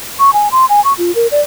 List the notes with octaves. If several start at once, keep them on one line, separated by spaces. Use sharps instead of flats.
C#6
G#5
C6
G#5
C#6
F4
A#4
D5